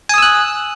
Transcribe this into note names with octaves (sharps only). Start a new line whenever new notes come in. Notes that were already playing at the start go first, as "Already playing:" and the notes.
G#5 D#6 E6 F#6